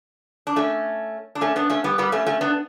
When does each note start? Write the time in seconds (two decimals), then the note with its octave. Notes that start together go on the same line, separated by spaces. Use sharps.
0.47 D4
0.56 A3 C#4
1.35 D4
1.41 A3 C#4
1.56 B3 D4
1.70 A3 C#4
1.84 G3 B3
1.98 G3 B3
2.12 A3 C#4
2.26 A3 C#4
2.41 B3 D4